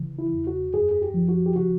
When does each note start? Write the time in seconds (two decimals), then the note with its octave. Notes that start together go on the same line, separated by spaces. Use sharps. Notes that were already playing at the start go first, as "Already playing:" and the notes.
Already playing: C#3 E3
0.19 E4
0.33 E2
0.47 F#4
0.74 F#2 G#4
0.91 G#4
1.02 G4
1.14 F3
1.29 F#4
1.46 G4
1.56 C#3 F#4